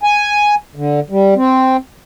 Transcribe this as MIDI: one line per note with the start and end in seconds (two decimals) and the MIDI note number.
0.03 0.55 80
0.75 1.00 50
1.10 1.34 55
1.36 1.77 60